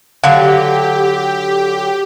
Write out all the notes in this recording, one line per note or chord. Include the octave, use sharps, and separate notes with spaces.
D3 F#3 G4 F5 F#5